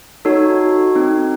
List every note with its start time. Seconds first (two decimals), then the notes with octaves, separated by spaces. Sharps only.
0.25 D#4 F#4 A4 C#5
0.95 C4 D#4 F#4